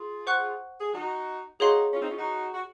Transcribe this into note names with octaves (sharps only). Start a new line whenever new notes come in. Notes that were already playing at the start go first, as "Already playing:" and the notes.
Already playing: F4 G#4
C5 F#5 C#6 F#6
G#4
D#4 F#4
D#4 F#4 G#4 C#5 F5 C6
C#4 F4
C4 D#4
C#4 F4
D#4 F#4
F#4